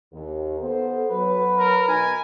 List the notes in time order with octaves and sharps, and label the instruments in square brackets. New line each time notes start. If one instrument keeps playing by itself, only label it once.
[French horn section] D#2
B3 A4 C5
[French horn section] F#3 [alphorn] B4
[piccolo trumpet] A#4
[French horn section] B2 D#4 [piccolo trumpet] G#5